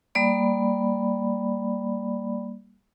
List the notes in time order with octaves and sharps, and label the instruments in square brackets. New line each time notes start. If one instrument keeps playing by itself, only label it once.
[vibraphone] G3 A#3 D5 B5